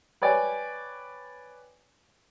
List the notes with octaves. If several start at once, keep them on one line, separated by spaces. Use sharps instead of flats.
B4 C#5 D5 G5 G#5